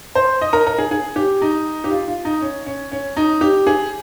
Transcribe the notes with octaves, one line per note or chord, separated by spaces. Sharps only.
C5
D#5
A#4
A#4
G#4
G#4
G4
D#4
G4
F4
F4
D#4
C#4
C#4
C#4
D#4
G4
G#4